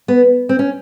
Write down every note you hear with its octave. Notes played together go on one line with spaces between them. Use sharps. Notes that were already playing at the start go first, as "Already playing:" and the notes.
B3
C4
C#4